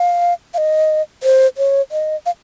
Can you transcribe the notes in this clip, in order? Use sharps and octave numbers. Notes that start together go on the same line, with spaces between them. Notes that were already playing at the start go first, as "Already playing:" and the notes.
Already playing: F5
F5
D#5
C5
C#5
D#5
F5